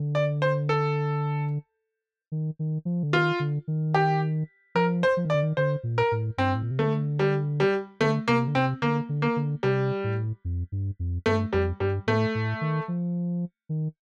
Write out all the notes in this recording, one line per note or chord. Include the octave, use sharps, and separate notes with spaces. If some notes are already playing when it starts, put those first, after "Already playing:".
Already playing: D3
D5
C5
A4
D#3
D#3
F3
D3
D#3 F4
D3
D#3
G4
F3 A#4
C5
F3
D#3
D5
D3
D#3
D3 C5
A#2
A#4
A2
G2 C4
A2
A#2
C3
D3 A3
G3
G3
D3 A3
C3 A#3
D3
C3 C4
D3 A#3
D3
A#3
D3
C3 G3
A2
F2
G2
F2
G2 A3
F2 G3
G2 G3
A2 A3
A2
D#3
F3
D#3